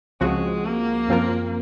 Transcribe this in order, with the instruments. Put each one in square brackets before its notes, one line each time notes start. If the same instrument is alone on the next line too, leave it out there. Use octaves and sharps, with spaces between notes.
[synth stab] C#2 C#3 F3 C4 F#4 [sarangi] G#3
[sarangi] A#3
[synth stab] F#2 F3 C4 F4 A#4